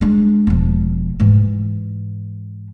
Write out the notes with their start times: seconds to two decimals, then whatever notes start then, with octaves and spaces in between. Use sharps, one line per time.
0.01 G#3 D4
0.47 E1 F3
1.20 G#2 E3